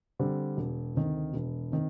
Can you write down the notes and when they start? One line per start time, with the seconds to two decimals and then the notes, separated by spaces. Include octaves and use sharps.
0.19 D3 G3 C4
0.57 E1
0.95 D2 C3 D#3
1.33 E1
1.72 C3 D#3